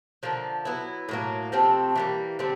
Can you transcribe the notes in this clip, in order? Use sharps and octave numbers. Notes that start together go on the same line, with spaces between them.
D3 F3 A#3
F#3 B3 E4
A2 F#3 A#3
C3 F3 A3 C4
E3 G3 A#3
D3 G3 C4